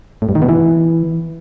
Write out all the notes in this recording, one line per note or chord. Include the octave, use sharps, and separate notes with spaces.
A2
G2
D#3
B2
E3